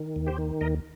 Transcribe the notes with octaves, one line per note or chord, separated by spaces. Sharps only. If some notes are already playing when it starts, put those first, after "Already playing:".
Already playing: D#3
D#2
G4 C5
D#3
D#2 A#4 D#5